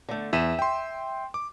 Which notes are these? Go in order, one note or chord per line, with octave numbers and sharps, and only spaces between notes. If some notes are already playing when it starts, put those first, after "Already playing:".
D3 A3
E2 E5 D#7 E7
G5 C6
D6